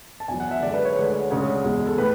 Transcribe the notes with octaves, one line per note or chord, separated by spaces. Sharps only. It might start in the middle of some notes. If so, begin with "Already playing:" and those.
A5
E2 B2 F#3 G#5
F#5
E5
F#2 D3 G#3 D5
B4
C#5
D2 D3 G#3 B4
C#5
D2 C#3 G#3 C#5
E2 B2 G#3
A4
A2 B4